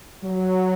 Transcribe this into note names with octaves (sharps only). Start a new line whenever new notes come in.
F#3